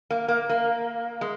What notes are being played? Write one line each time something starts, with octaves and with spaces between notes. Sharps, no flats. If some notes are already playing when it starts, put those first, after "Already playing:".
A#3
A#3
A#3
G#3